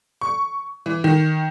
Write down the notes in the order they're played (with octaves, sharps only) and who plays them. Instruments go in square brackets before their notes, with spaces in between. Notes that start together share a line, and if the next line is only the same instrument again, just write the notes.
[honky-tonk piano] C#6
E3
D#3